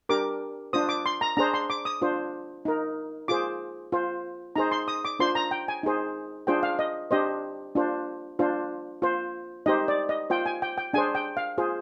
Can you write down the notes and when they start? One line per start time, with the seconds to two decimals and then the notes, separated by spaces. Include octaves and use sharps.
0.09 D4 G4 A#4 D6
0.73 D4 F4 C5 D#6
0.89 D6
1.06 C6
1.21 A#5
1.37 D4 G#4 C5 A#5
1.54 C6
1.70 D6
1.85 D#6
2.02 D4 F4 C5
2.65 D#4 A#4
3.28 F4 G#4 C5 D6
3.92 F4 C5
4.56 D#4 G#4 C5 A#5
4.71 C6
4.88 D#6
5.05 D6
5.19 D4 F4 C5 C6
5.35 A#5
5.51 G5
5.68 G#5
5.83 D#4 G#4 C5
6.47 D4 F4 G#4 C5 G5
6.63 F5
6.79 D#5
7.11 D4 G4 C5 D#5
7.75 D4 F4 C5
8.39 D4 F4 C5
9.02 F4 C5
9.66 D#4 G4 C5 D#5
9.88 D5
10.09 D#5
10.30 F4 C5 G5
10.46 G#5
10.62 G5
10.78 G5
10.93 D4 G#4 C5 G#5
11.15 G5
11.37 F5
11.58 F4 G#4 C5